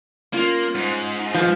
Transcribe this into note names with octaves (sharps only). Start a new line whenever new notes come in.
A#3 C#4 F4
G#2
F3 B4 A5